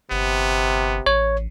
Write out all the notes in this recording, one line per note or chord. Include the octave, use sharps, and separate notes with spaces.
G1 C3 B3
A1 C#5